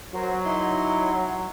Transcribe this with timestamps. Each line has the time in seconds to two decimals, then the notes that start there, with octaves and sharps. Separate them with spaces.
0.14 F#3 A#4 C5
0.45 D#4 E4 C6